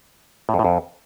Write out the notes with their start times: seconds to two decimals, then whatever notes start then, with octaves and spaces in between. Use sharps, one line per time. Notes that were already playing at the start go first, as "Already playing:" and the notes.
0.49 A2
0.54 F2
0.59 A2
0.64 F2